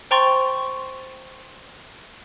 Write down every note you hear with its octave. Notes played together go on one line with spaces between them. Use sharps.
C5 G5 A#5 C6 C#6 A6